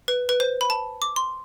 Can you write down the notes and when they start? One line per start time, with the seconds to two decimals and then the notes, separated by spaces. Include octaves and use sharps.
0.08 B4
0.29 B4
0.40 C5
0.61 B5
0.70 A5
1.02 D6
1.16 C6